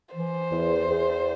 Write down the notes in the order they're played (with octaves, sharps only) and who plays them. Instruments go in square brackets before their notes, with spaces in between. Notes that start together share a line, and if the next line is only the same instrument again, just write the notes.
[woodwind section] E3 [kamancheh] C5
[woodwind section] E2
E2